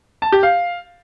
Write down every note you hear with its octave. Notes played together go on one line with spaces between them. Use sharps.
A5
G4
F5